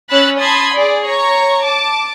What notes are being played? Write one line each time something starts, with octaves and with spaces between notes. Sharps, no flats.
C#4 C#5 B5 E6 F#6 A6
A5 B5 C6 D#6 G#6
G#4 D5
C#5 A#5 C#6
A5 D6